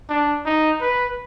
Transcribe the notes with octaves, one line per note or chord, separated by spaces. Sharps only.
D4
D#4
B4